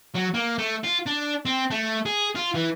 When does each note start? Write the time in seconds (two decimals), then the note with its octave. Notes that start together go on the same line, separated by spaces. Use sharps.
0.15 F#3
0.34 A#3
0.58 A3
0.83 F4
1.06 D4
1.45 C4
1.70 A3
2.06 G#4
2.36 F4
2.55 E3